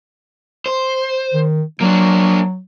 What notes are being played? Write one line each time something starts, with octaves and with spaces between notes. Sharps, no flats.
C5
D#3
F#3 A#3 D4